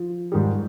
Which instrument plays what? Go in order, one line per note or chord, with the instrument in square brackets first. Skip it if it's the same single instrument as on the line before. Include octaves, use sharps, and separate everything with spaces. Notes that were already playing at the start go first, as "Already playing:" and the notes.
Already playing: [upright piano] F3
[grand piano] G#2 D#3 G3